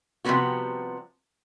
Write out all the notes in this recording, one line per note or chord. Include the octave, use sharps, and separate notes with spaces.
C3 F3 G3 G#3 B3 F#4